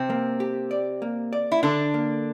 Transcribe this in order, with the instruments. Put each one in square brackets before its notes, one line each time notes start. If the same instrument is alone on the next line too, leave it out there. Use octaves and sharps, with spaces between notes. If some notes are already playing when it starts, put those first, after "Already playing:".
Already playing: [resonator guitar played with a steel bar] C3 C4
[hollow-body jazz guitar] A#3
G4
D5
A#3
D5
[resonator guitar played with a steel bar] E4
[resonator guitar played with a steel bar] D3 D4 [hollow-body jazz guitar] A4
[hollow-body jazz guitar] A#3